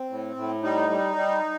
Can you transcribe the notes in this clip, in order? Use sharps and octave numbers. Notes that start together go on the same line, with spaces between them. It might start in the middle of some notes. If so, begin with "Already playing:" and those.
Already playing: C4
A2
A2
G3 D#4
G3
G3